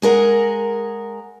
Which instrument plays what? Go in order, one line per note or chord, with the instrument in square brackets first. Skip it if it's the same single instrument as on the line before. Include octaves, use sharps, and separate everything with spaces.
[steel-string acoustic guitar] G#3 G#4 A#4 F#5